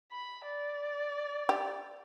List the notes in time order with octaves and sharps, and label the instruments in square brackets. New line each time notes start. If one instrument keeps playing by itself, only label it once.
[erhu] B5
D5
[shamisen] G4